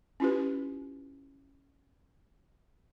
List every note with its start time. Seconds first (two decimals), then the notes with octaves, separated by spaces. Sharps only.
0.20 C#4 E4 F4 G4 B4